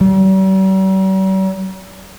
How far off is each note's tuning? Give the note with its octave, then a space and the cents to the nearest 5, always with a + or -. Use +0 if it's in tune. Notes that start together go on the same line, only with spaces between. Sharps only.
G3 -45